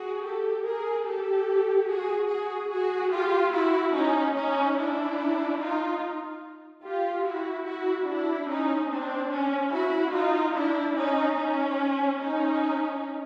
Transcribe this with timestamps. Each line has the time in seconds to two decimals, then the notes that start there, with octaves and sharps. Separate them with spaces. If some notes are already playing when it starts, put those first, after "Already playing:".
Already playing: F#4 G#4
0.23 G4 A4
0.64 G#4 A#4
1.06 G4 A4
1.88 F#4 G#4
2.30 F#4 G#4
2.71 F#4 G#4
3.12 F4 G4
3.53 E4 F#4
3.94 C#4 D#4
4.36 C#4 D#4
4.77 D4 E4
5.60 D#4 F4
6.83 F4 G4
7.24 E4 F#4
7.66 E4 F#4
8.07 D4 E4
8.48 C#4 D#4
8.89 C4 D4
9.31 C#4
9.72 E4 F#4
10.14 D#4 F4
10.55 D4 E4
10.96 C#4 D#4
11.37 C#4
12.20 C#4 D#4